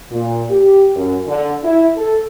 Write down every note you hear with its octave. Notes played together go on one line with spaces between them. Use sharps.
A#2
G4
F#2
D3
E4
A4